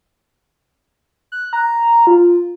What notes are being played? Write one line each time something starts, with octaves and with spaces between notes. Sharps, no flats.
F#6
A#5
F4